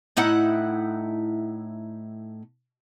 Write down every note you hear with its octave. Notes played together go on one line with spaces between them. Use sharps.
A2 D#4 E4 F#5